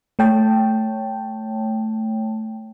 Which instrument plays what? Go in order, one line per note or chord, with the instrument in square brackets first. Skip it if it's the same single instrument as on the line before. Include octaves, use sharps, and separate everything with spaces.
[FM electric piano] A3 C#5 G5 A5